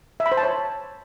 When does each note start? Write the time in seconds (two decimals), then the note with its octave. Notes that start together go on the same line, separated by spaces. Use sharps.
0.20 E5
0.26 B5
0.32 C5
0.37 A5
0.43 C#5